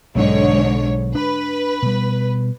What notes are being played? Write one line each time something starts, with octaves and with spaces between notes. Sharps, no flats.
B1 G#2 D3 F#3 C#5
D4 B4
B2 G3